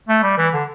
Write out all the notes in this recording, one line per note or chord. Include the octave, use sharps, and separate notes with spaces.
A3
G3
E3
D3